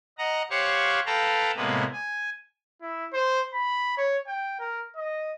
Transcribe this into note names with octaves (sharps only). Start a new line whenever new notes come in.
D#5 F#5 A#5
G4 C5 C#5 F5 F#5 C#6
A4 B4 F5 G5 A5 A#5
A2 C3 G#3 A#3 B3 B4
G#5
E4
C5
B5
C#5
G5
A#4
D#5